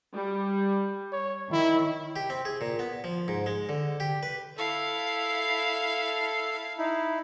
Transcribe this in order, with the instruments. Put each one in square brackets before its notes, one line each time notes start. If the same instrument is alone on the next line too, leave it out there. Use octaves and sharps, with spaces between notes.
[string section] G3
[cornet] C#5
[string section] D#3 [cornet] E4
[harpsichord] G4
C4
G#4
A#2
B3
F3
G#2
G#3
D3
G4
B4
[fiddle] E4 F5 [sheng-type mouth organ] A4
[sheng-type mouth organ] D#4 E4